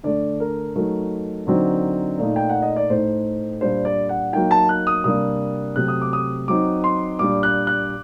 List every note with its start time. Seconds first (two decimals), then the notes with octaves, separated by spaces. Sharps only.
0.04 D3 A3 D4 D5
0.40 A#4
0.76 F#3 A3 D#4 A#4
1.47 D3 F#3 C4 D#4
2.18 A#2 A3 D#4
2.36 G5
2.50 F#5
2.62 D#5
2.76 D5
2.90 A2 A3 D#4 C5
3.61 A#2 G3 D4 C5
3.85 D5
4.09 F#5
4.33 F#3 A#3 D#4 G5
4.51 A5
4.69 F#6
4.87 D#6
5.04 C3 G3 A#3 D4 D#6
5.76 C3 F#3 A3 C4 F#6
5.88 D#6
6.02 D6
6.13 D#6
6.48 F#3 C4 D#4 D6
6.84 C6
7.19 A#2 G3 D4 D6
7.43 F#6
7.67 F#6